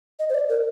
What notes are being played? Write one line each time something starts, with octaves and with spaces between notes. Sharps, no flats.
D#5
C5
D5
A#4